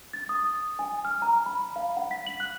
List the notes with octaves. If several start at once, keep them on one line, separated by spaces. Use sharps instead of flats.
A6
D#6
G#5
F6
A#5
B5
F5
F#5
B6
F#7
F#6